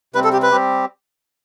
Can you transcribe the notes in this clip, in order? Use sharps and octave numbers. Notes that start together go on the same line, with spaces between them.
C3 G3 C4 B4
A4
G4
B4
G3 C4 G4